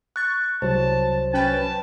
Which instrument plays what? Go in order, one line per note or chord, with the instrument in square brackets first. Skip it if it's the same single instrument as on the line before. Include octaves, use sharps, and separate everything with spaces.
[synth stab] C#6 [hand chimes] F#6 A6
[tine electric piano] C2 F#3 [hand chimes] C5 [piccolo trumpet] A5
[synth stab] C#4 B4 G5 [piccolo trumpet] A5